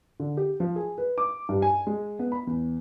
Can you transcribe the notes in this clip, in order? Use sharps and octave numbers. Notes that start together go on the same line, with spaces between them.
D3
G4
F3
G#4
B4
D6
G2
G#5
G#3
B3
B5
E2